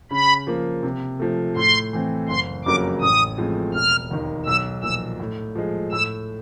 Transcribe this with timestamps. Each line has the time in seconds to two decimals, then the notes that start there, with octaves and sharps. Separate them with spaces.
0.11 C#3 B5
0.47 F3 A#3
0.83 C3
1.20 F3 A3
1.56 A2 C6
1.93 E3 A3 C4
2.28 F#1 C6
2.65 F2 C#3 F#3 A#3 D6
3.02 A1 D#6
3.37 A2 F3 G#3 C4
3.74 E1 F6
4.11 D#2 D#3
4.46 B1 E6
4.83 A#2 F3 E6
5.20 A2
5.55 F3 G#3
5.92 A2 E6